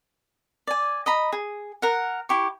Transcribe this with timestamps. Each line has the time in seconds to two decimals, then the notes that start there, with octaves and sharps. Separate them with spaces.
0.67 D5 G#5
1.06 D#5 A#5 B5
1.33 G#4
1.82 A#4 F#5
2.29 E4 G4 C#6